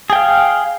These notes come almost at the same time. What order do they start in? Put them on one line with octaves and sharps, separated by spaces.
G#4 G5 F5